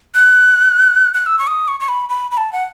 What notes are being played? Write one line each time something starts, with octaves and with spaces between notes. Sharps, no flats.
F#6
F#6
E6
C#6
D#6
C#6
C#6
B5
B5
B5
A5
F#5